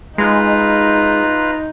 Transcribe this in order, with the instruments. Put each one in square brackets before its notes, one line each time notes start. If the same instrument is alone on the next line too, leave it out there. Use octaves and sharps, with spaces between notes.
[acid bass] G#3 [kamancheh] D#4 [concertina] F4 B4 A#5